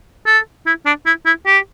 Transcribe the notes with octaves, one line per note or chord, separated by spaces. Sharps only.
A4
E4
D4
E4
E4
G4